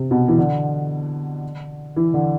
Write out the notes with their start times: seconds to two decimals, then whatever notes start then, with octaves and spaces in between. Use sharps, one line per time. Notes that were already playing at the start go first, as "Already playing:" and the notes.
Already playing: C3
0.11 B2
0.28 E3
0.38 D3
1.96 E3
2.13 D3